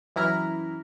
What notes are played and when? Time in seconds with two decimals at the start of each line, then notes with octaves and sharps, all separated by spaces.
0.16 F#2 E3 E4 A#5 F6